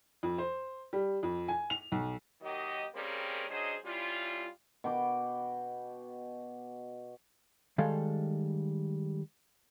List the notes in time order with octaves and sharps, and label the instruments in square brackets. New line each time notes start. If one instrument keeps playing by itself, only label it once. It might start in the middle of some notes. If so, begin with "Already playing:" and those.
[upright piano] F2
C5
G3
F2
G#5
F7
B1
[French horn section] D#2 D#3 F#3 G4 D#5
G3 A#3 C4 C#4 G#4 A#4
F#3 C#4 D4 G#4 C5 D#5
G3 C#4 E4 F4
[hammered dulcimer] B2 F#4 G5 D6
[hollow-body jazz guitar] D#3 G3 G#3 A4 F5